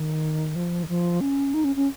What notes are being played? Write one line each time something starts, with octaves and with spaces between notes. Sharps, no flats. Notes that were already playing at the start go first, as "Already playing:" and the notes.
Already playing: D#3
F3
D#3
F3
C#4
D#4
C#4
C#4